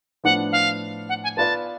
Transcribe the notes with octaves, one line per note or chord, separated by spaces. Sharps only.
A2 F3 B3 D4 F#5
F5
F#5
G#5
B3 F4 B4 D5 F5 A5